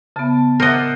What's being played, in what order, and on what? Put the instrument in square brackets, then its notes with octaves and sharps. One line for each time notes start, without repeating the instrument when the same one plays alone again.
[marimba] C#3 B3 [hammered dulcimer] A5
[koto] A#4 D#5 [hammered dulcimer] C5 D5 F#5